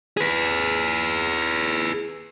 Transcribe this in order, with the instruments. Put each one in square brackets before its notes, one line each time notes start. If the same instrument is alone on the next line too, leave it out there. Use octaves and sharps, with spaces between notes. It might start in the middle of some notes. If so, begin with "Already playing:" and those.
[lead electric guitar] G#4 B4